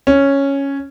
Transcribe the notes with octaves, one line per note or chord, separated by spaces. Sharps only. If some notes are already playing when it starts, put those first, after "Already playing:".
C#4